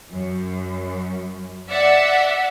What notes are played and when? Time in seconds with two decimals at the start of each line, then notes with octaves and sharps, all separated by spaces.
0.12 F#2
1.69 D5 E5 F#5